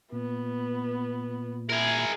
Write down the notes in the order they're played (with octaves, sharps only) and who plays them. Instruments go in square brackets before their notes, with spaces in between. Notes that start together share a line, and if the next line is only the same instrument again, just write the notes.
[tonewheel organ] A#2 [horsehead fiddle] B3
[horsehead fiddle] E4 [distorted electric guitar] G#4 A#4